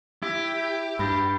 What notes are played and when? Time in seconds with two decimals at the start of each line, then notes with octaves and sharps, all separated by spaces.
0.23 E4 G4
0.99 G2 B5 G6